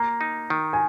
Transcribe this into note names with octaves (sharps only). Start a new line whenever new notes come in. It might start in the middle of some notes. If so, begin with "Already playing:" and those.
Already playing: A#3 A#5
D#4
D#3
G#5